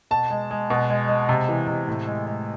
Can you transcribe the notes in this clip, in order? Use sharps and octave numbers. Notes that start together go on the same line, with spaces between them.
B2 A5
G#3
G#3
B2
G#3
G#3
C3
E3
C3
A2
G#3
G#3